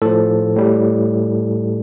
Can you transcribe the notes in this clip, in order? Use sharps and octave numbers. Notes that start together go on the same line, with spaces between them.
A2 F3 A4
A2 G3